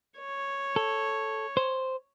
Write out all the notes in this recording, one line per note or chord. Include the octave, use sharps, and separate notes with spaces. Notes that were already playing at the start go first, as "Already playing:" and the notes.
C#5
A4
C5